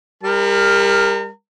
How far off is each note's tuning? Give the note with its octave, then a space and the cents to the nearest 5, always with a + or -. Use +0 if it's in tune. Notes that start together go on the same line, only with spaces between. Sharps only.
G3 +30 A#4 +0 A#5 -40